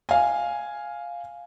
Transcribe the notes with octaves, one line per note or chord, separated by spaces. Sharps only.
F5 G#5